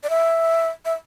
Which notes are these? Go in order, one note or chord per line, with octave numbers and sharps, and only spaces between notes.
D5
E5
E5